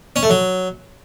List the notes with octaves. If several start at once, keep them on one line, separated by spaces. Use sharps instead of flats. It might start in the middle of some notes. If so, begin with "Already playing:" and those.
C#4
A3
F#3